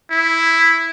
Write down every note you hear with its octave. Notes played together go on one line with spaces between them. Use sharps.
E4